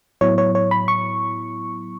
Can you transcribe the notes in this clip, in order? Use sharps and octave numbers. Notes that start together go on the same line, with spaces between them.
A2 F#3 B3 E4 C#5
C#5
C#5
B5
C#6